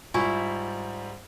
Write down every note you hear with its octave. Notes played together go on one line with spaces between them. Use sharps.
G#2 G3 E4 F4 G#5 C#6